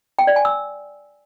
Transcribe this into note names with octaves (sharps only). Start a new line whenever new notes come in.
G5
D5
G#5
E6